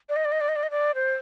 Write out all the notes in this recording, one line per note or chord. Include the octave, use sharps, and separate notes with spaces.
D5
D#5
D5
D#5
D5
D#5
D5
D#5
D5
C5